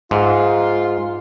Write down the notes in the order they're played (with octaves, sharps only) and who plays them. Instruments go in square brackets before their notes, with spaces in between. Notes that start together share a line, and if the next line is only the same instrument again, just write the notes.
[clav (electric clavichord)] G#2 [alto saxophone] F4